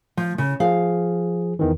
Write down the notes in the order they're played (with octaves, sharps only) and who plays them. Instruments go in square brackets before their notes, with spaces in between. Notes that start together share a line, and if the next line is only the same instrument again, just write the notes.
[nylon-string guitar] F3
C#3
[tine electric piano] F3 G#4 [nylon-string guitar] F5
[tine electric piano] E2 D#3 E3